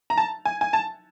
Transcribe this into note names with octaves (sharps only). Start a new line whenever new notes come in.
A#5
A5
G#5
G#5
A5